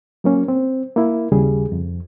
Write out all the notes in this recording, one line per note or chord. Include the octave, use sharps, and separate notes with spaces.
F#3 A#3 C#4
C4
A#3 E4
D#2 C#3 G3 G#4
F2